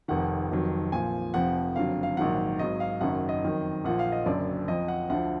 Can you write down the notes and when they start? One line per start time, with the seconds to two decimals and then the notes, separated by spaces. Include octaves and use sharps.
0.08 F1 F2 D#3 F#5
0.51 F1 F2 D#3 F#3
0.92 A#1 A#2 F3 G#5
1.34 F1 F2 F3 F#5
1.76 F#1 F2 D3 F#3 F5
2.03 F5
2.17 A#1 G#2 D#3 F#3 F#5
2.59 G#1 G#2 F#3 D#5
2.80 F5
3.01 F#1 F#2 D#3 F#3 F#5
3.29 D#5
3.42 F2 D#3 F#3
3.84 A#1 A#2 F3 F#5
3.99 F5
4.12 D#5
4.26 F#1 F#2 D3 F#3 D5
4.68 F2 F3 D#5
4.88 F#5
5.10 D2 D3 F3 F#5